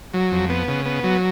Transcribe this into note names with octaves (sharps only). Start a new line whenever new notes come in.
F#3
F2
B3
C#3
B3
F#3